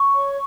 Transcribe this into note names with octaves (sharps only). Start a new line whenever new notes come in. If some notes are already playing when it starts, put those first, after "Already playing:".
Already playing: C#6
C#5